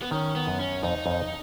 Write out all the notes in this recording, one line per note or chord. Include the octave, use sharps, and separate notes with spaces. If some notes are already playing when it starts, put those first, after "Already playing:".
B3
D#3 C#4
B3
F#2
C#4
F2 D#4
F2